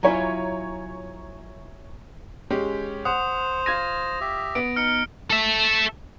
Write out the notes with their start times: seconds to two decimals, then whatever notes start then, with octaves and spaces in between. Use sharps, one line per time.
0.03 F#3 E4 F4 C#5 G#5 A#5
2.50 G#3 C#4 G4
3.05 C5 F#5 D#6
3.66 F4 G#6 A#6 D#7
4.21 G4 E5
4.55 B3 D7
4.76 D#4 F6 C#7
5.30 A4 E5